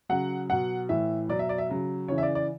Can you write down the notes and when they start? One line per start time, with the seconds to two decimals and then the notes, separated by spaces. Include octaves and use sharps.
0.09 C#3 F#3 F#5
0.49 B2 F#3 F#5
0.89 A2 E3 E5
1.28 B2 F#3 D5
1.39 E5
1.49 D5
1.58 E5
1.69 C#3 F#3
2.08 C#3 E3 C#5
2.18 E5
2.23 D5
2.35 D5